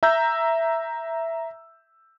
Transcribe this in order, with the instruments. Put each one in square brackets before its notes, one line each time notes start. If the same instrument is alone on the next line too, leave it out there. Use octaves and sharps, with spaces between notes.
[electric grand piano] E5 A#5 E6 G6